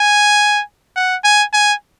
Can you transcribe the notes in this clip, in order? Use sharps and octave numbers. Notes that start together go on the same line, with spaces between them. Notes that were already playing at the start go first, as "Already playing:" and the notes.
Already playing: G#5
F#5
G#5
G#5